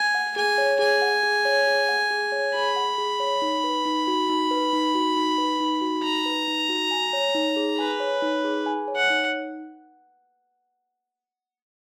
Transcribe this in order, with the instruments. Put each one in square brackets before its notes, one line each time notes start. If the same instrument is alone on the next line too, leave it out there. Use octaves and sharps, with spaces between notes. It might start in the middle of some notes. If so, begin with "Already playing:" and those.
Already playing: [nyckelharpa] G#5
[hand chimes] F#5
[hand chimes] G#4 [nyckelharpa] G#5
[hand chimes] C#5
[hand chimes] G#4 [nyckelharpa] G#5
[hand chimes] F#5
G#4
C#5
G#4
F#5
G#4
C#5
[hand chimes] G#4 [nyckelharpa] B5
[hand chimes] F#5
G#4
C#5
D#4
B4
D#4
F#4
D#4
B4
D#4
F#4
D#4
B4
D#4
F#4
[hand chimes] D#4 [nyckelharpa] A#5
[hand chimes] B4
D#4
F#4
G#5
C#5
D#4
G#4
[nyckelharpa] B4 [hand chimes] G#5
[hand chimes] C#5
D#4
G#4
G#5
C#5
[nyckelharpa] F#5
[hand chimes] D#4